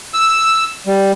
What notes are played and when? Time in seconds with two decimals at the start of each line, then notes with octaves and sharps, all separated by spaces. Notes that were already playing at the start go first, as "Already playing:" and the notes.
0.14 E6
0.87 G3